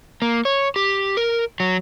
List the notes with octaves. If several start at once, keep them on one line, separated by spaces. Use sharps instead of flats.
A#3
C#5
G4
A#4
F#3